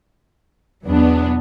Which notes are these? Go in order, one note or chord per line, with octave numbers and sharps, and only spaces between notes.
E2 B2 F#3 B3 D4